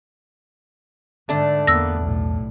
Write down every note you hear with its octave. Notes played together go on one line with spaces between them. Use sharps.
G#2 D3 A3 D4
E2 A#3 B3 E6 A#6
B1 E2 A2